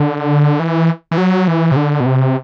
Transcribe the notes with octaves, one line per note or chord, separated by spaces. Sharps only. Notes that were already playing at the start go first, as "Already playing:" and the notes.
Already playing: D3
E3
E3
F#3
E3
C3
D3
B2
C3